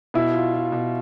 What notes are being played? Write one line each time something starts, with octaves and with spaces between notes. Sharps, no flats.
B2 E4
F4
F4
B2